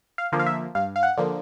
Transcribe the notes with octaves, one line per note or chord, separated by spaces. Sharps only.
F5
D3 F3 A#3
F5
E5
G2 F5
F5
F#5
D3 F3 A#3